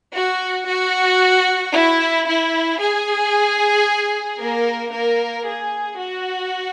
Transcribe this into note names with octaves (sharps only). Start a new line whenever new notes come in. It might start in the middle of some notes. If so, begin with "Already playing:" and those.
F#4
F#4
E4
E4
G#4
A#3 A#4
A#3 A#4
G#4
F#4